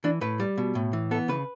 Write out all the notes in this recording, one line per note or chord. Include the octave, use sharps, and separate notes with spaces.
E3 D4
A2 B4
G3
B2
A2
E3
B3 A4
C#3 B4